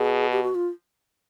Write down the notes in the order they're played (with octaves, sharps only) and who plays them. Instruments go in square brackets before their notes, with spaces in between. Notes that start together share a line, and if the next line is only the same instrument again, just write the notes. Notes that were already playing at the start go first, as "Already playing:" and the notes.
Already playing: [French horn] B2 [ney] G#4
[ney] G4
F#4
F4